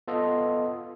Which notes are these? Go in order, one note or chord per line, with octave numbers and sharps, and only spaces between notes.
B3 F4 A4 D#5